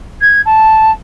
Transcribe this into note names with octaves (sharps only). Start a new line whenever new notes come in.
G#6
A5